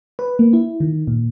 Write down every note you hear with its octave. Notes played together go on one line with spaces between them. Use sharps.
B4
A#3
E4
D#3
A#2